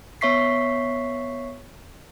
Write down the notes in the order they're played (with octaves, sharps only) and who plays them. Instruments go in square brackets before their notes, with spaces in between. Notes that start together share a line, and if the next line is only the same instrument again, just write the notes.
[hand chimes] B3 C#5 E5 C#6 B6 C7